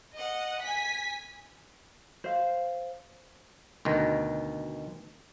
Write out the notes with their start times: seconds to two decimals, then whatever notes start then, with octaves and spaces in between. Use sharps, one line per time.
0.16 D#5 F#5
0.62 G#5 B6
2.24 C5 F5
3.85 D2 B2 D#3